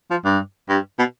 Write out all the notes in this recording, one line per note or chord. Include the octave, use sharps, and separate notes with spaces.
F3
G2
G2
B2